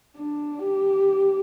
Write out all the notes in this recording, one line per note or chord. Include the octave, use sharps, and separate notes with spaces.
D4
G4